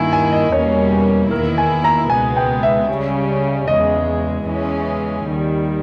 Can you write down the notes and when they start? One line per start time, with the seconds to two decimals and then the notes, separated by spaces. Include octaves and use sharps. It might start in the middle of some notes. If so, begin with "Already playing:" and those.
Already playing: G2 D#3 A#3 E4 G#5
0.13 G#5
0.32 D#5
0.52 E2 B2 G3 A#3 C#4 C#5
1.31 E2 D#3 A#3 E4 A#4
1.58 G#5
1.84 A#5
2.10 C#2 B2 G#3 B3 G#5
2.37 G5
2.63 E5
2.89 C#3 G3 C#4
3.68 E2 C#3 G#3 D#5
4.46 E2 C#3 E3 G#3 C#4
5.25 D#2 D#3 G3